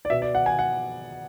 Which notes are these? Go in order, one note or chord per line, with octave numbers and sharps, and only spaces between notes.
D5
B2 E5
D5
F#5
G#5
F#5